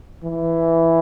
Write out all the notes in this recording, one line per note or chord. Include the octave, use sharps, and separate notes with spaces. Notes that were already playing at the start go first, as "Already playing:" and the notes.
E3